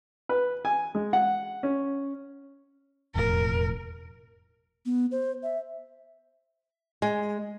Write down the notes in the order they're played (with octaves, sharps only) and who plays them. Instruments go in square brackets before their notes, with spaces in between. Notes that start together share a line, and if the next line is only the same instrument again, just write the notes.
[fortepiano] B4
G#5
G#3
F#5
C#4
[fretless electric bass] E1 F2 A2 [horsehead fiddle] A#4
[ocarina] B3
C5
E5
[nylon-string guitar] G#3